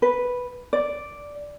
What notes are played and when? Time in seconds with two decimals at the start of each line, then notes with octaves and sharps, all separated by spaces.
0.02 B4
0.73 D5